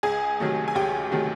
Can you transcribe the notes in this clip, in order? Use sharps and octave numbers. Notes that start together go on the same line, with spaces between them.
C#2 G#4 G#5
C3 D#3 F#3 A3
G#5
C#2 G4 G5
C3 D#3 F#3 A3